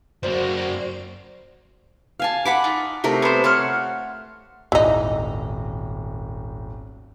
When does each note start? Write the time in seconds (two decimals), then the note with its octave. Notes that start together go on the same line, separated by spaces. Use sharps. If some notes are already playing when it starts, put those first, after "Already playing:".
0.23 F#2 A#3 F#4 C5 D5
2.20 F5 G#5 A5
2.45 F#5 B5 D6
2.64 D#4 F4
3.04 C3 A3 D#4 A#4
3.22 B3 C5
3.44 F4 C#5 F#5 F6
4.72 D#1 G#1 E3 D#4